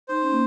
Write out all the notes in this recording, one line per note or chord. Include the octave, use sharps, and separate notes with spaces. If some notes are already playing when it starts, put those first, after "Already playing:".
D#4 C5
C#4
A#3